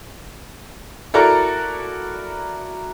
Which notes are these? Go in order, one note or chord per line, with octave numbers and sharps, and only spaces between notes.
E4 F#4 A4 A#4 D5 A#5